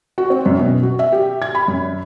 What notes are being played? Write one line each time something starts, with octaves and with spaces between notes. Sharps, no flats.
F#4
C4
F#2
B2
F#4
E5
G4
G#6
B5
F#2